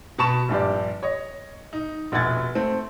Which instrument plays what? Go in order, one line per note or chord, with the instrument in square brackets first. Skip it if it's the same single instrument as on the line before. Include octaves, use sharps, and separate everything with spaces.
[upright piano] B2 A5 B5 C#6 E7
A#1 G2 G4 D5
C#5 D#5
D#4
F1 A#1 B2 F#5 G#6 A6
A3 C4